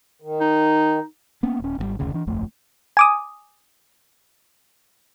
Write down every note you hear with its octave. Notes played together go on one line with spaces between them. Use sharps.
D#3
D#4
A#3 B3 C#4
D#1 C#4
G#1 D3 G3
F#1 D2 C#3
E3 D4
D1 G1 F2 A3
G#5 D6 D#6